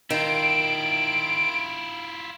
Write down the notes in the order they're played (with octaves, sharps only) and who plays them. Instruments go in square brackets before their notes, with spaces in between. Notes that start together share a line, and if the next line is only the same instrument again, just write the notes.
[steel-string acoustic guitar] D#3 [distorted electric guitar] E4 F4 [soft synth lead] D7